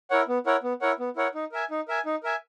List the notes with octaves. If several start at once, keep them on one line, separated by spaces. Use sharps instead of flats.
E4 A#4 C#5 F#5
B3
E4 A#4 C#5 F#5
B3
E4 A#4 C#5 F#5
B3
E4 A#4 C#5 F#5
D#4
A#4 E5 G#5
D#4
A#4 E5 G#5
D#4
A#4 E5 G#5